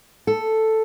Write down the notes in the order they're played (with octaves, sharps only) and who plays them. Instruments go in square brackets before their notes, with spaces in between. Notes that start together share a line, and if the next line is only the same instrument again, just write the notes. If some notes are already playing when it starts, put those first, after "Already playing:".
[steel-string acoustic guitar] A4